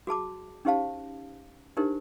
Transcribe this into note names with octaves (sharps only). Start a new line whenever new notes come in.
F#4 G#4 A5 D6
C#4 D#4 G4 C5 F5 A5
D4 D#4 G4 A#4 C5